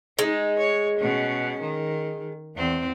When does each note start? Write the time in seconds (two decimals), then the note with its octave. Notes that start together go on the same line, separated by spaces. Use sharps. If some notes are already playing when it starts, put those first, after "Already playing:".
0.19 G#3 D#4
0.59 C#5
0.99 B2 C#4
1.61 D#3
2.56 E2 C4